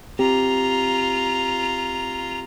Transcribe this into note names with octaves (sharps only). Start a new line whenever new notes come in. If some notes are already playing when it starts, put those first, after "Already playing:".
C4 F4 G4 A#5